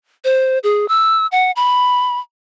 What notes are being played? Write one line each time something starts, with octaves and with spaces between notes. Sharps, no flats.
C5
G#4
E6
F#5
B5